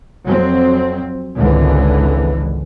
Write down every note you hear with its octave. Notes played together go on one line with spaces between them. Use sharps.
F2 F#3 C4
G#1 C#2 D3 E3